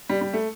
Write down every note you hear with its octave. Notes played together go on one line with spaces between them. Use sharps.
G3
G3
A3